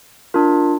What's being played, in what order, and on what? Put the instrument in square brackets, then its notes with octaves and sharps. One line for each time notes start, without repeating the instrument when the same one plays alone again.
[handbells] D4 F4 A#4